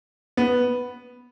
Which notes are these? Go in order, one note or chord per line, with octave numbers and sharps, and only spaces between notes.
B3